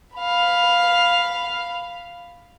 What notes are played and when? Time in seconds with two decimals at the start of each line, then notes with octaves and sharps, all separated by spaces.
0.16 F5 B5